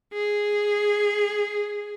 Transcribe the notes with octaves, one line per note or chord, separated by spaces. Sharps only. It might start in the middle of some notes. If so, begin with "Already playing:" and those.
G#4